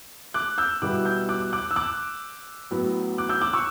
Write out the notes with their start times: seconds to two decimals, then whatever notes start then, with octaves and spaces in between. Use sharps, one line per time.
0.34 D6 F#6
0.58 E6 G6
0.82 B2 G3 B3 E4 D6 F#6
1.05 E6 G6
1.29 D6 F#6
1.53 D6 F#6
1.71 E6
1.76 D6 F#6
2.71 A2 F#3 B3
3.18 D6 F#6
3.29 E6 G6
3.41 D6 F#6
3.53 C#6 E6